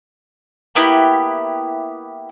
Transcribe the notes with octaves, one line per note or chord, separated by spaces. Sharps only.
A#3 B3 E4 G4